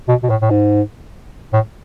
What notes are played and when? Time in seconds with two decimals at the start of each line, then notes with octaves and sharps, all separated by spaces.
0.08 B2
0.23 B2
0.30 A2
0.42 A2
0.51 G#2
1.53 A2